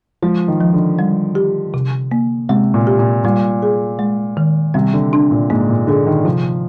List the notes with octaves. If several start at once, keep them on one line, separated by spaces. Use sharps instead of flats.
F3 G#3
D#3
F3
D3
G3
G4
C3
A#3
C3 G#3
A#2
G4
A#2
A#2 G3
G#4
G#3
D#3
C3 G3
D3
D4
A#2
G#2 A#3
A#2
D3 G#4
D#3
C3 F3